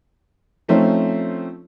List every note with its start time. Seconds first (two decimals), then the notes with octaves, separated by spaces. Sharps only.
0.68 F3 A3 C4 C#4 D#4